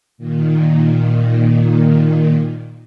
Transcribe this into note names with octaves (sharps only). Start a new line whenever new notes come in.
A#2 D#3